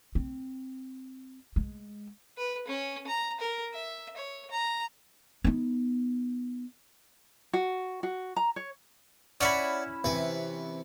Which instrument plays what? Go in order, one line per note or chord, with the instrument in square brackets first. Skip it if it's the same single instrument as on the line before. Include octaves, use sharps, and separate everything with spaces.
[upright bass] C4
G#3
[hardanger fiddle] B4
C#4
A#5
A#4
E5
C#5
A#5
[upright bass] B3 D#4
[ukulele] F#4
F#4
A#5
C#5
[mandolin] C#4 E4 B5 [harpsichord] C#5 D5 F#5
[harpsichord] C3 E3 B4